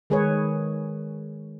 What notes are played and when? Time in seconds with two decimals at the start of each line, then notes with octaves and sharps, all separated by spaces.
0.10 D#3 G#3 G#4 B4 C#5